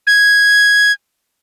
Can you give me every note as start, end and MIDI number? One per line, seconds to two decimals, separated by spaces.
0.07 0.92 92